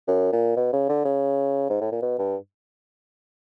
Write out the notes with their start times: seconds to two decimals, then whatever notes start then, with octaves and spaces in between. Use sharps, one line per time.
0.08 F#2
0.32 A#2
0.56 B2
0.73 C#3
0.89 D3
1.05 C#3
1.70 G#2
1.81 A2
1.92 A#2
2.02 B2
2.19 G2